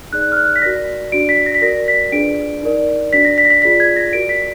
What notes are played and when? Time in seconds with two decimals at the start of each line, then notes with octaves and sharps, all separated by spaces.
0.13 D#4 G#4 D5 F#6
0.32 F6
0.37 F#6
0.56 B6
0.62 F#4 A#4 D5 A#6
1.12 D4 F#4 D5 D7
1.29 B6
1.46 A#6
1.54 B6
1.62 F#4 A#4 D5 A#6
1.88 B6
2.12 D4 F4 G#4 B4 D5 D7
2.62 D#4 A#4 D5
3.12 D4 F#4 D5 B6
3.25 A#6
3.38 B6
3.45 A#6
3.50 B6
3.62 F4 G#4 D5 B6
3.80 G#6
3.96 A#6
4.13 F#4 A#4 D5 D7
4.29 B6